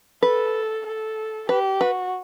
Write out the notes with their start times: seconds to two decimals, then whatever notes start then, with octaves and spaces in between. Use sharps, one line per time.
0.23 A4 B4
0.86 A4
1.49 G4 B4
1.81 F#4 B4